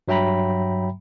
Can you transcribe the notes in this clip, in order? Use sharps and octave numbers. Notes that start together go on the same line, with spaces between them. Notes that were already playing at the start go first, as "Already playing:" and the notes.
G2 F#3 E5 G5 A#5 B5